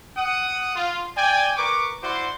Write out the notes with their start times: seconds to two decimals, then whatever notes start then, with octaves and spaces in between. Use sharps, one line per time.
0.17 F#5 D#6
0.76 F4
1.16 D5 G5 G#5
1.56 A#4 B4 C#6 D6
2.02 E4 F#4 C5 D5 C6 D6